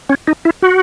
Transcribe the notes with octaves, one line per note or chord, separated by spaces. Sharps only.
C#4
D#4
E4
F#4